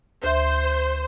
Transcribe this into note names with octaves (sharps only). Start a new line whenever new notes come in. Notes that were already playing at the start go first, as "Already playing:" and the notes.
D2 C5 E5